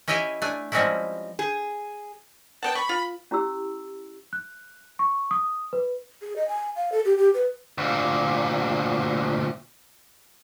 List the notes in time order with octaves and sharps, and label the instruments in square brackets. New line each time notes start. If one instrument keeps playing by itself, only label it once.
[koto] C#4 E4 G4 D#5 E5 G#5
A3 D4 G#5
F3 G3 G#3 C4 C#4 E4
[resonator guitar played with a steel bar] G#4
[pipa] B3 F#5 [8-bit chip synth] G5 A5
[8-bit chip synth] B5 [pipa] C#6
[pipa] F4
[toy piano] C#4 E4 G4 E6
[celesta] F#6
C#6
D#6
B4
[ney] G#4
D#5
G#5
F5
A4
G4
G4
B4
[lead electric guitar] D2 A#2